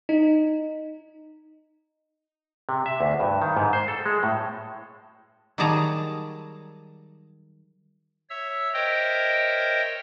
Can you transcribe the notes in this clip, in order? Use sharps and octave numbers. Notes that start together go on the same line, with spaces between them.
D#4
C3
E5
D2
G2
D#3
G#2
C5
A4
G#3
A2
D#3 F#3 G3 G#4 A5 A#5
C#5 E5 E6
A#4 C5 C#5 D#5 E5 G5